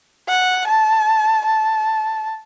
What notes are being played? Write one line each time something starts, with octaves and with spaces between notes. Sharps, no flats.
F#5
A5
A5